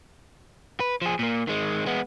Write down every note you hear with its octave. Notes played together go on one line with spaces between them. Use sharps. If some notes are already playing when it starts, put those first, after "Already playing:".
B4
F3 G#4
A#2 A#3
D#3 G#3
G#3 B3